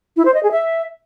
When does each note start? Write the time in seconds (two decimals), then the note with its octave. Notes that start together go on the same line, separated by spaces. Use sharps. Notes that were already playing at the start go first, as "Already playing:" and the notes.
0.17 E4
0.25 C5
0.34 D#5
0.43 G#4
0.52 E5